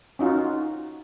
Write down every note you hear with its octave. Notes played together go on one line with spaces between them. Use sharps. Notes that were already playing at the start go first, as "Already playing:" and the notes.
C#4 D#4 F4 F#4